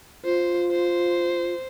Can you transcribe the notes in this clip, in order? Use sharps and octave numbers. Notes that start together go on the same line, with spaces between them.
F4 C5
C5